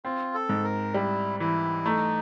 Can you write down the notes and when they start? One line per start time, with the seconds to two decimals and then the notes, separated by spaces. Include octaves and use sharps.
0.05 C4 F4
0.34 A4
0.49 G#2
0.64 A#4
0.94 G3 E4
1.40 E3 E4
1.85 A3 D#4